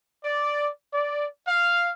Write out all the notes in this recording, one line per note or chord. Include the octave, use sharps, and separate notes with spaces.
D5
D5
F5